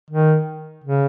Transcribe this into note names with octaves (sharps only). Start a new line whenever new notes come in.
D#3
C#3